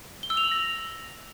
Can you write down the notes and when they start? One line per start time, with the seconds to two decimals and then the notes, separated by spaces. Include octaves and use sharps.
0.23 G7
0.30 E6
0.37 F7
0.44 F#7
0.51 A#6